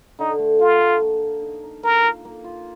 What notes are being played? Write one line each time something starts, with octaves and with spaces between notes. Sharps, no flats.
D3 D#4
A3
D3 F4
A3
A#3
A#3
D#4
D#4
A#3 A#4
F4
A#3
F4